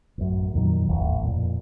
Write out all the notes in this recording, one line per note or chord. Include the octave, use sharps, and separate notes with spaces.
A1 F#2
F2 A#2 D#3 F#3
D#1 A1 E2
F2 A#2